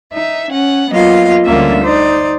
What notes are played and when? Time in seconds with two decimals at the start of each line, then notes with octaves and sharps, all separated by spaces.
0.12 D#4 E5
0.50 C#4 F#5
0.89 F#3 A#3 B3 F4 D#5 F5
1.45 D2 D3 G3 A#3 C#4 E5
1.83 D#4 C5 D5